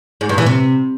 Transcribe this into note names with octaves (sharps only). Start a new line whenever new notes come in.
G#2
G2
E3
C3